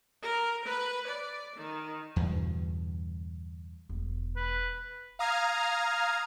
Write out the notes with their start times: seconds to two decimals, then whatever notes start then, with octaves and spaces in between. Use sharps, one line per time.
0.22 A#4
0.65 B4
1.08 D5
1.56 D#3
2.16 E2 G2 B2 D3
3.89 E1
4.37 B4
5.19 F5 A#5 D#6 F6 G#6